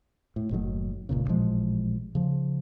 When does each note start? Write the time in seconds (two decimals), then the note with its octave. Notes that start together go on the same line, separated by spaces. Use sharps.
0.36 A2
0.51 F#1 A2 D#3 F#3
1.09 F1 C#2 A#2 C#3
1.28 A1 A#2 F3 G#3
2.15 C#3 F3